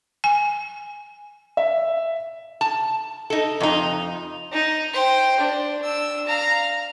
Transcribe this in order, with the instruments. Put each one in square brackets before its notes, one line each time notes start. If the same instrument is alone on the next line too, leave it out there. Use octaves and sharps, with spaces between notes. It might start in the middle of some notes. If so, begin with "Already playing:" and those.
[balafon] G#5
[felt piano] E5
[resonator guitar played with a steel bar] A5
D#4 A4
F2 D#4
[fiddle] D#4
C5 G5
D4
D4 E6
F5 A#5